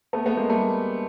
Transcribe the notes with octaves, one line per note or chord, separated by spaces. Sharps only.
A3 B3
A3 B3
G#3 A#3
G3 A3